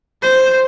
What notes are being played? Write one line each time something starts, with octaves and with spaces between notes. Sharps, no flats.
C5